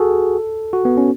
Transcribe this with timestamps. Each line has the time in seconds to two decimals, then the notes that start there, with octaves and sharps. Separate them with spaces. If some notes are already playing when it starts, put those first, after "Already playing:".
Already playing: F#4 G#4 A4
0.73 F#4
0.85 B3
0.97 C#4